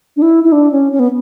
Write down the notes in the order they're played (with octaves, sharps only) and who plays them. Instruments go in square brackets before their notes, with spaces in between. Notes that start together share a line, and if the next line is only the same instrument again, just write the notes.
[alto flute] D4
E4
E4
D4
C#4
C#4
B3